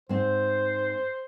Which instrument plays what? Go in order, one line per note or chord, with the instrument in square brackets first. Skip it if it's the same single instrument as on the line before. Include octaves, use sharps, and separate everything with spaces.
[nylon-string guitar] G#2 C4 [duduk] C5